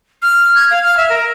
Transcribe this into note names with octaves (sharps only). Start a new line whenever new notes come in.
F6
G#6
F5
F6
E5
A#4